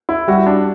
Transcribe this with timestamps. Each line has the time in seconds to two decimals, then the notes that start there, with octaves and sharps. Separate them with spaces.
0.09 E4
0.28 G3 F#4
0.46 D4